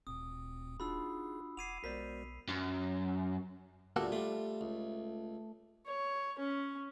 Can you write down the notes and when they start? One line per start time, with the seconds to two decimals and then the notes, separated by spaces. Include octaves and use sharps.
0.07 D1 D2 A#2 C4 D#6
0.80 D4 D#4 F4 F#4 G#4 B5 E6
1.57 E1 F#5 D6 G#6 C7 D#7 F7
1.84 B1 G#3 B3 F#4 A#4 C5 D5 B6
2.49 F#2
3.96 D2 A#2 G3 A#3 F#4 A4
4.12 G3 A3 F4
4.61 C#2
5.87 C#5
6.39 C#4